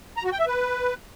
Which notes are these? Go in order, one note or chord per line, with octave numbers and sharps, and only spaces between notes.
A#5
F#4
G5
E5
B4